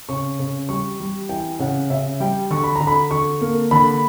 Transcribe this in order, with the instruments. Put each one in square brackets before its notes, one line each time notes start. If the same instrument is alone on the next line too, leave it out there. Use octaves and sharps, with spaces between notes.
[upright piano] C#3 C#6
C#3
G3 C#6
G3
E3 G5
C#3 F#5
C#3 E5
G3 G5
D3 C#6
B5
D3 A#5
B5
D3 C#6
A#3
D3 B5